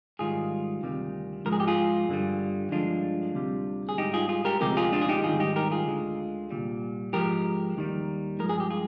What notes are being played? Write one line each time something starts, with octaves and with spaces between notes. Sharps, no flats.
G#2 D#3 G3 F4 G#4
D2 C3 D#3 G3
G#2 F3 G#3 A#4
G#4
G4
F4 G#4
G2 D3 G3
G2 D3 F3 G#3 D4 F4
D2 C3 G3
G#4
G#2 G3 D#4 G4
F4 G#4
F4 G#4
G4 A#4
D2 C3 F3 G#3 G4 A#4
F4 G#4
D4 F4
G#4
D#4 G4
G#2 D#3 G3 F4 G#4
D#4 G4
G4 A#4
F4 G#4
D2 D3 G#3
C2 A#2 G3
G#2 F3 G#3 G4 A#4
D#2 D#3 G3
G2 F3 G#3 A#4
G#4
G4
F4 G#4